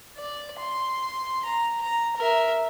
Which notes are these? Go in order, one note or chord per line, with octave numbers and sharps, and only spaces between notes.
D5
C6
A#5
A#5
A#4 E5